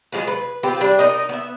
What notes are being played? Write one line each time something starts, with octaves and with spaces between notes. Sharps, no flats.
F#3 G#3 F4 B4
B4
C4 F4 G4 B4
G3 D4
D#4 A#4 D#5
B3 E5